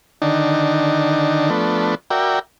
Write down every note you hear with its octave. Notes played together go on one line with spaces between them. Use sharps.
D3 D#3 D4 D#4
F3 A3 B3 D4
F#4 A#4 D5 E5 G5